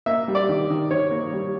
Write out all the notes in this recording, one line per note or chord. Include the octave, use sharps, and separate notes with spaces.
A#3 E5
G3
D5
D#3
D#3
D#3 C#5
A#3
G3